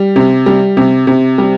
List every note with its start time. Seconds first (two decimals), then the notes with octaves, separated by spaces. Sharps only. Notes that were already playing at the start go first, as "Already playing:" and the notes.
Already playing: G3
0.16 C3
0.46 G3
0.77 C3
1.07 C3
1.38 G3